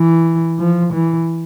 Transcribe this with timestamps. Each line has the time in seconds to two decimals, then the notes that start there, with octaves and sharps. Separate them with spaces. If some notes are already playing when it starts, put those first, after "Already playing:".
Already playing: E3
0.59 F3
0.93 E3